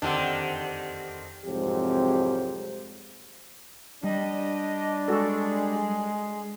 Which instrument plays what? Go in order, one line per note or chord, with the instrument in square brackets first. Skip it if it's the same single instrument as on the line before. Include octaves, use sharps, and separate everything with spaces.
[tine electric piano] F2 G4 F#5 [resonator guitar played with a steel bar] D3 C4 D4 [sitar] D#3
[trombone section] C2 F2 G#2 F#3 G4 C5
[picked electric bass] G3 [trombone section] D4 [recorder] D#5
[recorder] G#3 [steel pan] F#4 A4